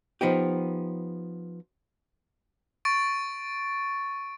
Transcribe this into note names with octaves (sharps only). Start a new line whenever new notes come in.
F3 B3 D#4 G4
C#6 A6 D7